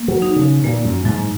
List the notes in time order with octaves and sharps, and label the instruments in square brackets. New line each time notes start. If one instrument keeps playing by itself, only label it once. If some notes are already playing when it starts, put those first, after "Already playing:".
Already playing: [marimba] A#3
[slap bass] F#3
[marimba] D#4
[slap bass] C#3
[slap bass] A#2 [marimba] A#3
[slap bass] F#2
[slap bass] G#2 [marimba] F#3